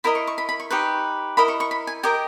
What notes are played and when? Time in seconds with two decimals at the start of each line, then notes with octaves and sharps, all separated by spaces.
0.04 E4 A#4 D#5 B5
0.15 C#6
0.27 C#6
0.38 B5
0.49 B5
0.60 C#6
0.70 D#4 G4 B4 C#6
1.37 E4 A#4 D#5 B5
1.48 C#6
1.60 C#6
1.71 B5
1.87 G#5
2.03 G4 A#4 D#5 G#5